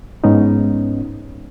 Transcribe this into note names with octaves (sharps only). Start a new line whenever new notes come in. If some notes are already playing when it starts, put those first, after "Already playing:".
G#2 G#3 B3 C#4 D#4